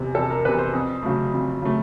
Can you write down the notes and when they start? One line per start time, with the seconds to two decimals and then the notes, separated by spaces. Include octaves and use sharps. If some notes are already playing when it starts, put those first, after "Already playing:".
Already playing: F1 E2 C3
0.15 F1 A4
0.30 A#4
0.45 E2 C3 B4
0.59 C5
0.73 F2
1.03 C#3 F#3 A3
1.33 F2
1.62 C#3 F#3 A3